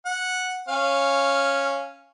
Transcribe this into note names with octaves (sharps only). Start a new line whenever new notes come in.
F#5
C#4 F5